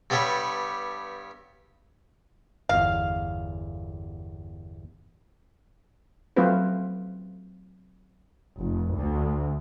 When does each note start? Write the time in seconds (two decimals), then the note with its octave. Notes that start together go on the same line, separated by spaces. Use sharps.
0.10 G2 G3 B3 A4 C#5 C#6
2.69 G1 E2 F5
6.36 F#3 A3 C4 F4 B4 C5
8.59 F1
8.96 D2